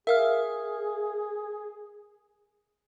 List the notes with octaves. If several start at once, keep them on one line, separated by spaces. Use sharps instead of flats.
G#4 A#4 E5 F5 F6